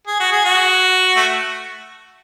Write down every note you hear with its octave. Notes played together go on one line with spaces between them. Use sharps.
G#4
F#4
G#4
F#4
A3